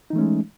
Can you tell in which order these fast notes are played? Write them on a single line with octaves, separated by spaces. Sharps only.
D#4 E3 A3 C#4 G#3